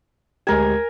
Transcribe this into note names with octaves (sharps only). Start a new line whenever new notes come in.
D2 G#3 G4 A#4 G#5